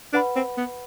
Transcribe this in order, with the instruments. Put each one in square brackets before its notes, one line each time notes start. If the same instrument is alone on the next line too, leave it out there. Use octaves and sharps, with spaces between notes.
[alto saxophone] D4 [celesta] B4 F#5 B5
[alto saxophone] C4
B3